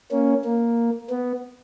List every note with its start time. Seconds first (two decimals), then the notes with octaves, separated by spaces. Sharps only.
0.11 A#3 C#4
0.44 A#3
1.10 B3